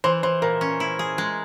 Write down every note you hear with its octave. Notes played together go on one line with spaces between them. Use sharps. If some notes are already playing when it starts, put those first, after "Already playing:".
E3 C5
E3 C5
A#2 A#4
C#4
E4
G#4
G#3